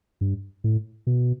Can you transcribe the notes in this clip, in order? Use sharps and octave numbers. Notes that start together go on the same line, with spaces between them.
G2
A2
B2